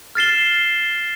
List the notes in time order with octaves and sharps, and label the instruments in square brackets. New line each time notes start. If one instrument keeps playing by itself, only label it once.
[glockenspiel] F6 A6 C7 E7 G7